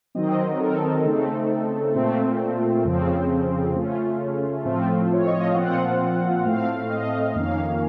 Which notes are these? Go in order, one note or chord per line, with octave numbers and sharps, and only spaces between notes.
D#3 F#3 C4 D#5
A#4
A4
C#3 A3 C4 D#4
A#2 A3 C4 F4
F2 C#3 F3 C4
C#3 A3 C#4 F4
A2 F3 A3 C4 F4
C#5
D#5
F5
A#2 F3 C4 F4 F#5
A2 A3 C4 F5
D#5
F2 D#3 A#3 C#4 F5